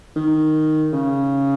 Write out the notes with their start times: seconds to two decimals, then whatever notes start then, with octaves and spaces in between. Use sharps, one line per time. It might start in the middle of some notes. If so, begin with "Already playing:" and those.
0.16 D#3
0.92 C#3